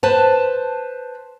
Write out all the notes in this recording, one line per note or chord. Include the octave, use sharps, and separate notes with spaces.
B4 C5 A5